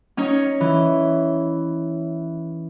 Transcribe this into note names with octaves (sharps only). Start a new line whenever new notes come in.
C#4 D#4 C#5
E3